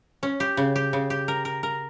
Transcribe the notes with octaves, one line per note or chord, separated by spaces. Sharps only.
C#4
G4
C#3
G4
C#3
G4
A#4
A#4
A#4